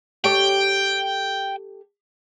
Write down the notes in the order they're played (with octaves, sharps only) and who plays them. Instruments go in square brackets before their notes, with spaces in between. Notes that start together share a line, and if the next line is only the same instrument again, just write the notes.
[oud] G4 A4 C#5 [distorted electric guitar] G5